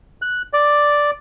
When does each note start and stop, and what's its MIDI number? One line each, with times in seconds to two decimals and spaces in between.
0.22 0.42 90
0.53 1.11 74